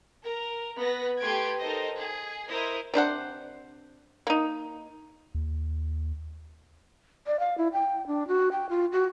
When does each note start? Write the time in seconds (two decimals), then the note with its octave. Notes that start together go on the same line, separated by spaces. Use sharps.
0.22 A#4
0.79 B3 B4 A#6
1.20 A3 G4 B4 C6 G#6 D7
1.60 D#4 A4 A#4 C5 D#5
1.98 G#4
2.48 E4 A#4 C5 D#5 D#6
2.94 C3 D4 C5 F#5
4.27 A#3 D#4
5.35 D#2
7.27 D5
7.40 F5
7.58 E4
7.73 G5
8.07 D4
8.28 F#4
8.52 G5
8.69 F4
8.92 F#4